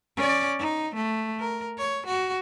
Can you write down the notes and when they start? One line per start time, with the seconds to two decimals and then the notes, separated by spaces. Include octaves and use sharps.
0.17 C#4 D5
0.59 D#4
0.95 A3
1.39 A#4
1.78 C#5
2.07 F#4